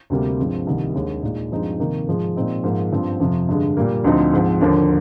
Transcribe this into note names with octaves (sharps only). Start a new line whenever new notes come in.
D2 C3 G3 A#3
G2 F3 G#3 C4
C2 C3 D#3 G3 A#3
D#2 D#3 G#3 D4
A#2 G#3 D#4
G2 F3 G#3 C4 D#4
C3 D#3 A#3 D#4
G#2 F3 G#3
A#2 G#3 C4 D#4
G#2 F3 A#3
G2 F3 C4
F2 C3 F3
G2 D3 G#3
A#2 G3 A#3
D2 D3 F3 C4 D#4
G#2 F3 C4
D#2 D3 F3 A#3 D4